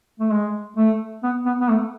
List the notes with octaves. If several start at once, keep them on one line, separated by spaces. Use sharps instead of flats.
A3
G#3
A3
B3
B3
B3
A3